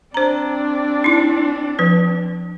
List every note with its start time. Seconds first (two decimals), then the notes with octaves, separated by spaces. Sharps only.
0.14 C4 D4 C5 A#5
1.04 D#4 E4
1.79 F3 B4